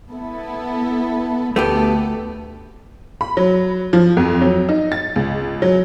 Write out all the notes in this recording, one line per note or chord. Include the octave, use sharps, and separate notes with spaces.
B3 E4 A4
D2 A3 B3 G4 A4
B5
F#3
F3
F2
F#3
D#4
A6
C#2
F#3